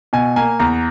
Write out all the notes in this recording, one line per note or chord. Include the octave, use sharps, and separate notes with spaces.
B2 G#5
A#3 G#5
E2 A#5